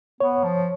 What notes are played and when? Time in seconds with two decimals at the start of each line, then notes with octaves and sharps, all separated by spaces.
0.20 B3 C#5
0.44 F3